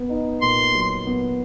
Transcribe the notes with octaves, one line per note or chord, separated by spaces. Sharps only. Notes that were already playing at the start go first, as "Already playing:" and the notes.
Already playing: B3
D#4
A#2 C6
F#3
B3